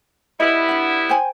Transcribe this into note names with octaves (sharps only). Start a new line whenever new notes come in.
G3 B3 E4 B4 D#5
D4 F#5
C5 G5 G#5